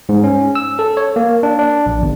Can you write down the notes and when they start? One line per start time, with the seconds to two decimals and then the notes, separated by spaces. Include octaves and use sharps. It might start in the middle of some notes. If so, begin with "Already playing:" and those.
0.09 G#2
0.24 C#4
0.55 E6
0.79 A4
0.97 C#5
1.16 A#3
1.43 D4
1.59 D4
1.86 A#1
2.02 G1